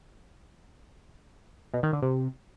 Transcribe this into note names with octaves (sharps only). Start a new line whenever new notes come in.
B2
D#3
D3
C3